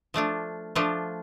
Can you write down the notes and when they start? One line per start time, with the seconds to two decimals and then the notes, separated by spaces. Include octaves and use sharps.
0.14 F3 A3 D4 F4
0.75 F3 A3 D4 F4